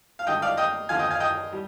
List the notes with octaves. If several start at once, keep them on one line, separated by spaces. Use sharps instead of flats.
F5
G#1 G2 D3 D#5 G5
D5 F5
D#5 G5
D#2 D3 F3 F5 G#5
D#5 G5
F5 G#5
D#5 G5
G3